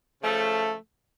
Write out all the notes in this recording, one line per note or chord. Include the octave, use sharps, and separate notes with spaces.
C#3 F3 A3